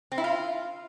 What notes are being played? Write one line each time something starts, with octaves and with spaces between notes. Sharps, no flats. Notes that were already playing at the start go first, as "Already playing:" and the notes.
C4
E4
F4